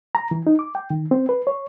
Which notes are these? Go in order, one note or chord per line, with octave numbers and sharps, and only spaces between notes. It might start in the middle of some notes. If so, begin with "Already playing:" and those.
A#5
E3
D#4
D6
G5
D#3
C4
B4
C#5